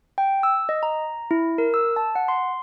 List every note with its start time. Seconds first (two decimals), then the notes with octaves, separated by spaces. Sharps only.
0.18 G5
0.43 E6
0.69 D#5
0.83 A#5
1.31 E4
1.58 A#4
1.74 E6
1.96 A5
2.15 F#5
2.28 C6